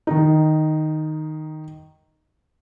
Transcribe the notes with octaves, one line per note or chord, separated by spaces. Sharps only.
D#3 D#4